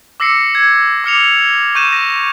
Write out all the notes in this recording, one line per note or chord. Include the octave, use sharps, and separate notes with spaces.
D6 E6 A#6 C7 C#7
G#6
D6 F6 C#7 F7
C#6 G6 D#7 E7
A#6